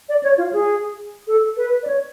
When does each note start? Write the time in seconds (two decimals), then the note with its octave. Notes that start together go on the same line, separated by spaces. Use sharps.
0.09 D5
0.23 C#5
0.38 F4
0.53 G#4
1.27 A4
1.57 B4
1.83 D5
1.87 C#5